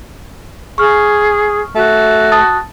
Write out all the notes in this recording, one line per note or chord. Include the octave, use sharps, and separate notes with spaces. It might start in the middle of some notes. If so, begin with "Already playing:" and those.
G#4 C#6 F6
A3 F#4
A5 D#6 A6